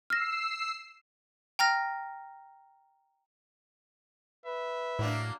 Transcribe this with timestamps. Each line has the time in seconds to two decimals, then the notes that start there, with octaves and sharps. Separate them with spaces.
0.10 E6 F6 A#6 C7
1.59 G5 A#5 F6 A#6
4.46 B4 E5
4.99 A2 F#3 A#3 D4